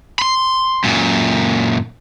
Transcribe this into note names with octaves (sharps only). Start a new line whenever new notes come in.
B5 C6
F#2 A#2